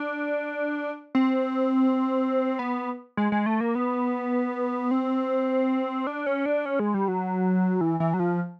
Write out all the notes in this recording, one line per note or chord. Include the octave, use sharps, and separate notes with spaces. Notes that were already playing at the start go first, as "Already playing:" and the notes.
Already playing: D4
C4
B3
G#3
G#3
A3
A#3
B3
C4
D4
C#4
D4
C#4
G#3
G3
F#3
E3
E3
F#3
F3